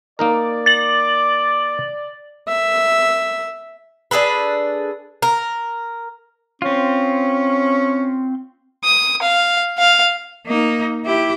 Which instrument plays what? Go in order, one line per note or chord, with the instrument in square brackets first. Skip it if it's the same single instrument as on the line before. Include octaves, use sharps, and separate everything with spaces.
[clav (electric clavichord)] A#3 D#4 A#4 [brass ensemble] D5
[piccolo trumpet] D6 [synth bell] A6 F#7
[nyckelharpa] E5
[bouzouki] D4 G#4 A4 B4
A#4
[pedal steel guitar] C4 F4 [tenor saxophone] C#4
[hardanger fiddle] D#6
F5
F5
[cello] A#3 D#4
E4 G4